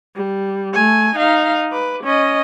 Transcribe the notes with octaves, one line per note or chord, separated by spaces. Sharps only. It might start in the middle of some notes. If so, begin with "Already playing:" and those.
G3
A3 G#5
D#4 F5
B4 D6
C#4 D#5